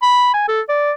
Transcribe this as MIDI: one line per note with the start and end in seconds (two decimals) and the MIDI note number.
0.02 0.30 83
0.34 0.47 80
0.48 0.61 69
0.69 0.92 74